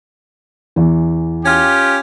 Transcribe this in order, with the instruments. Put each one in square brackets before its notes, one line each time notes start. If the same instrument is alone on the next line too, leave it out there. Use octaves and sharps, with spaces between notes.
[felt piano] E2 E3
[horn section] C#4 F4 G4